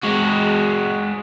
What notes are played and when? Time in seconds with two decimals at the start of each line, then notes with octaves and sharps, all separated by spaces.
0.03 G#3 F#4